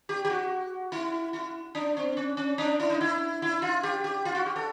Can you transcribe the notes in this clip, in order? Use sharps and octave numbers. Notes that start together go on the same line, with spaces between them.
G4
G4
F#4
E4
E4
D4
C4
C#4
C#4
D4
E4
D#4
E4
E4
F4
G4
G4
F4
F#4
G4
A4